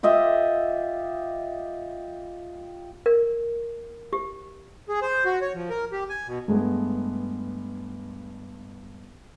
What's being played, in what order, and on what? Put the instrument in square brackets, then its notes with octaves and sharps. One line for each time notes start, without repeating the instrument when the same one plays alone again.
[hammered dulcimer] F4 G4 D#5 E5
[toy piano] A#4
G4
[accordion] G#4
C5
F#4
C#5
F3
A#4
G4
G#5
B2
[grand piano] G2 G#3 A3 B3